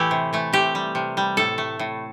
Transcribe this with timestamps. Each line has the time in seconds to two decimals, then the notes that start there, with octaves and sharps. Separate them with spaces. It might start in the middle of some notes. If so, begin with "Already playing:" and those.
Already playing: A2 E3 A3 E4 G4
0.11 C3
0.33 E3 A3
0.53 C3 G4
0.75 G3
0.95 C3
1.17 G3
1.37 A2 A4
1.58 A3
1.79 A2